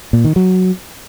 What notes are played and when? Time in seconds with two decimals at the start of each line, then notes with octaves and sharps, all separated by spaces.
0.13 A#2
0.25 D#3
0.36 F#3